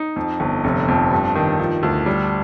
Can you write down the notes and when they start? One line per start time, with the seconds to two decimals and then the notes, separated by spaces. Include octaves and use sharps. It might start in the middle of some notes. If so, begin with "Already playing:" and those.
Already playing: D#4
0.16 F2
0.40 G1
0.64 F1
0.88 F2
1.11 G2
1.35 D#3
1.59 F3
1.83 D2
2.06 G3